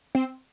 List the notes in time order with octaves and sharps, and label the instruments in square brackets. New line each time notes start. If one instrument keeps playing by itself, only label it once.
[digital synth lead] C4